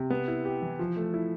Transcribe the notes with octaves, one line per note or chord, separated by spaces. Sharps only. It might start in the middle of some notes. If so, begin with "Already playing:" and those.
Already playing: C3
B3
E4
G4
E3
F3
A3
E4